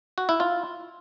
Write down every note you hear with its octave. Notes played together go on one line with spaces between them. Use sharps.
F#4
E4
F4